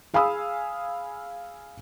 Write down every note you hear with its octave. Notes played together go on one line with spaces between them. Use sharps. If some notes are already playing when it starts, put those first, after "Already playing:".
G#4 F5 G#5 B5 D#6 E6